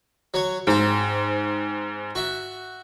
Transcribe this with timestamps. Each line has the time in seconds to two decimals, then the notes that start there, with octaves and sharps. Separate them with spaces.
0.34 F#3 C#5
0.67 G#2 C4 F5
2.15 F#4 E5